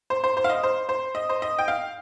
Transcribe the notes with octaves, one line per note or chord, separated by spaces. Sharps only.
C5
C5
C5
F5
D#5
C5
C5
D#5
C5
D#5
G5
F5